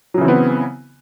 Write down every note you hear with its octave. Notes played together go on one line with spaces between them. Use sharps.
C#3 E3 F#3 B3 C4